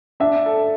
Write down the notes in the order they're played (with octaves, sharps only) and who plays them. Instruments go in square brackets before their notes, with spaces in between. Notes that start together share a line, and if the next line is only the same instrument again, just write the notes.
[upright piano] D4 [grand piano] E5
[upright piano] A4